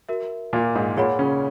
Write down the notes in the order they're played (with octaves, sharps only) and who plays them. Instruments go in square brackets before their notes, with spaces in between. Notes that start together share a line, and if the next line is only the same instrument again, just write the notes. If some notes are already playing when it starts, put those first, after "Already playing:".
[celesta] F#4 A#4 E5
[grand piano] A#2 A#3
G#2 G#3
[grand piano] A#2 A#3 [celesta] G#4 C#5 F#5 B5
[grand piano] C#3 C#4